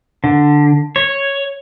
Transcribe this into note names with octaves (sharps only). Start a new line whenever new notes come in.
D3
C#5